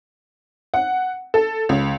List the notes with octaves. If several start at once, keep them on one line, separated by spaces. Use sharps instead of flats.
F#5
A4
C#2